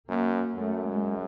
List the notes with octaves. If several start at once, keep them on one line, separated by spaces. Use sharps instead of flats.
F#2 A#3
F#2 A3
G#3